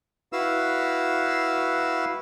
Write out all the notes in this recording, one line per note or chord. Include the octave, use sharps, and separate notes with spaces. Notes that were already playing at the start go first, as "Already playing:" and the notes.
E4 F#4 B4 F5 E6